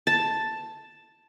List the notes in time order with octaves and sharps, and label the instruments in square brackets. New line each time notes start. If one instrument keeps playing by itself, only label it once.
[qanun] A5